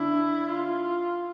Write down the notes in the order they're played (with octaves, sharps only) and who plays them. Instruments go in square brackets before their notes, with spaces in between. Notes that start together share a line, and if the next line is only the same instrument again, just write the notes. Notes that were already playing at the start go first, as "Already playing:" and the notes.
Already playing: [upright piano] D3 D4 [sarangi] E4
[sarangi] F4